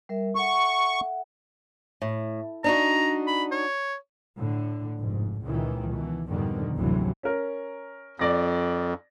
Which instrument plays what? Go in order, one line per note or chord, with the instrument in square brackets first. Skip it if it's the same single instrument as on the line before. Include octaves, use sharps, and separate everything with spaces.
[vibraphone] G3 A#4 E5
[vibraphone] A4 E5 F#5 [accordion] C#6
[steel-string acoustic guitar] A2
[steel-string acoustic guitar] D4 D#4 F#4 [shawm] A#5
[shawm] B5
C#5
[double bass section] A2 D3
F1 G#2
C#2 A#2 D#3 E3
B2 E3
F2 G#2 B2 D3 D#3 G3
F#1 D2 A2 C3 E3 F#3
[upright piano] C#4 A#4
[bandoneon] F2 [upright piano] D5 A#6